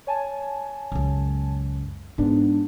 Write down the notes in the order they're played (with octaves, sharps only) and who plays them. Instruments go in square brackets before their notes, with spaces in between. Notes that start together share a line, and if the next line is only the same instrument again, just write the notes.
[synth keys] C#5 G#5 A5
[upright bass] C#2 F#2
[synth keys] G#2 B3 D4 [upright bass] G#3